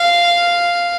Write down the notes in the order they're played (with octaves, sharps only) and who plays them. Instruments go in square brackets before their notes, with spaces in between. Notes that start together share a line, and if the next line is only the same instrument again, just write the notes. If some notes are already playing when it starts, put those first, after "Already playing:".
Already playing: [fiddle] F5